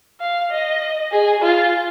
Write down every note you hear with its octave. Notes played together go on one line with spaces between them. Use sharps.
F5
D#5
G#4
F4